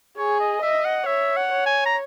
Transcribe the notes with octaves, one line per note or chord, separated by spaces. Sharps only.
G#4 C#5
D#5
D#5 E5
F#5
C#5 E5
F#5
C#5
G#5
A#5